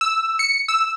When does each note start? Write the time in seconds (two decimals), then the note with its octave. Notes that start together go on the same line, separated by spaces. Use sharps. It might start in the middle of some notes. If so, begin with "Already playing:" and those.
0.01 E6
0.39 C#7
0.68 E6